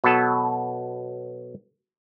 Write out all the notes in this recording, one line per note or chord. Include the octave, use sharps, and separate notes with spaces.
B2 F#3 B3 A4